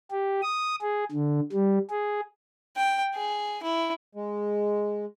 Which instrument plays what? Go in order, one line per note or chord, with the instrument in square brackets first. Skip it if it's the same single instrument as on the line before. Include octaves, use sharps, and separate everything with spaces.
[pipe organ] G4
D#6
G#4
D3
G3
G#4
[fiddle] G5
G#4
E4
[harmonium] G#3